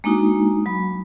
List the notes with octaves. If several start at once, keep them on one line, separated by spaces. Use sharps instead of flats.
G#3 A#3 D4 D#4 F#4
F#3 B5